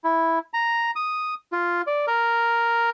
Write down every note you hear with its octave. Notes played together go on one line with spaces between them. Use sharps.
E4
A#5
D#6
F4
D5
A#4